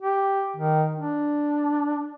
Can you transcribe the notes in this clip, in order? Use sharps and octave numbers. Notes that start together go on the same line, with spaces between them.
G4
D#3
D4